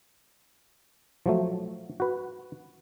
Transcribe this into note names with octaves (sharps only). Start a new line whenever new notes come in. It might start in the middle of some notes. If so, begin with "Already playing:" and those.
F3 F#3 A3
F#4 B4